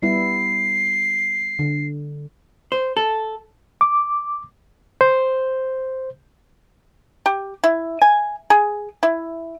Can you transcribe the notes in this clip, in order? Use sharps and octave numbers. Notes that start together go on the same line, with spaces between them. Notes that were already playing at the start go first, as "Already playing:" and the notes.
G3 B3 E4 C7
D3
C5
A4
D6
C5
G4
E4
G#5
G#4
E4